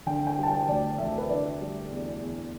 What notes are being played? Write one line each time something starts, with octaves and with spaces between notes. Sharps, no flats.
D3 G5
G5
G3
A5
G5
D2 D5
D2 E5
B4
D3 D5
G3
E2
E2